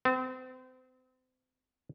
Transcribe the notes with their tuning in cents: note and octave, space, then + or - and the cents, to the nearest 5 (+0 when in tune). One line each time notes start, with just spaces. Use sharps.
C4 -35